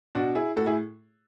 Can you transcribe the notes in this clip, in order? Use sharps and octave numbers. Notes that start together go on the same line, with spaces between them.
B2 D4 F#4
E4 G#4
A2 F#4 A4
E4 G#4